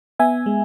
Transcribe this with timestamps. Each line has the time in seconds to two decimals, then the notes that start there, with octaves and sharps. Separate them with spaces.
0.19 B3 E5 G#5
0.46 G#3